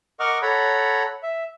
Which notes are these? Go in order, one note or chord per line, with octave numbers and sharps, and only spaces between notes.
A#4 D#5 F#5 C#6 D6 F6
A4 C#5 F#5 A#5 B5
E5